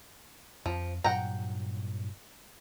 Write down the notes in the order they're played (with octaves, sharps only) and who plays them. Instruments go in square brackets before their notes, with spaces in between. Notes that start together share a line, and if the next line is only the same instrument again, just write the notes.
[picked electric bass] F2 [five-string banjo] F3
[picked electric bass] G2 A#2 F#3 [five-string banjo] F#5 G5 A#5